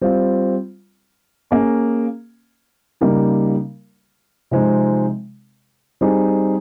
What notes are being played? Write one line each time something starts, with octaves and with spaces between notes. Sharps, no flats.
G3 C4 F4
A#3 C#4 G#4
C#3 G3 A#3 D#4 A#4
C3 F3 G#3 C4 D#4
G3 C4 D#4 G#4